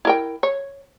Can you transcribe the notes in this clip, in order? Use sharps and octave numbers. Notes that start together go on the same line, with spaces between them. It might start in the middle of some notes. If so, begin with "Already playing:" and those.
E4 A#4 G5
C#5